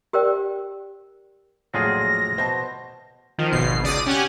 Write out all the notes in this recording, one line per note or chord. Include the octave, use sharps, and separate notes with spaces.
G4 A#4 C5 D5 G5
A#1 F2 A2 F#3 F4 G#4 A#6
B2 C5 A5
D#3 F3
G#1 B2 C7
C#2 D5 D#6 D#7
C#4 G4 F#5 G#5